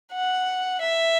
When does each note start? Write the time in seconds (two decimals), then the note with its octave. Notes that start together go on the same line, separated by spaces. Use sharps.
0.13 F#5
0.81 E5